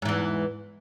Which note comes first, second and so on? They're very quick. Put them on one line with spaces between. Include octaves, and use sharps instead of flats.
G#2 E3 E2